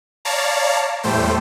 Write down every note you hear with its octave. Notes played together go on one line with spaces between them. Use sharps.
C#5 D5 F5 A5 A#5
E2 A2 G3 A3 C5 G5